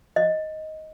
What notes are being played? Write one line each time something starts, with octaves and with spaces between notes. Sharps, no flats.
D#5